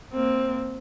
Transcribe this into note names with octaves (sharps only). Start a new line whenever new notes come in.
A#3 C4